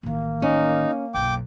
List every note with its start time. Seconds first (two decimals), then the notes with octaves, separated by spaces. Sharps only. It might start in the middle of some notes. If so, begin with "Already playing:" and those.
0.03 A1 D#3 A#3
0.42 C#4 D#4
1.14 F#1 B1 G5 D6